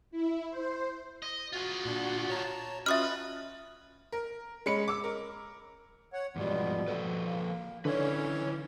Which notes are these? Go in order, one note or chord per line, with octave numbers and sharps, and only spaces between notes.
E4
C5
D#5
F4 F#4 G#4
A#2 D4
C#5 A5 A#5
C#4 F4 F#4 B4 D#5 E5 D#6 F6
A#4
G#3 C#4 B5 C#7
D6 E6
A#4
C#5 F#5
E2 G#2 B2 F3 G3 B3
F3 A4 B4
A#3
D3 C#4 D#4 E4 B4 C#5